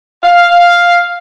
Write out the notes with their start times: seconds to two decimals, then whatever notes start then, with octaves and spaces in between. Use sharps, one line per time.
0.23 F5